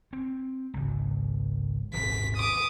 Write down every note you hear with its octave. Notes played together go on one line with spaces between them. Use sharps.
C4
G#1 C#2
D#1 G#1 C3 B6
D6 D#6